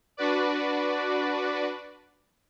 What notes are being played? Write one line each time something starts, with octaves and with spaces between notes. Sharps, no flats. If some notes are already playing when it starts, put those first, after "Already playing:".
D4 F#4 B4 D5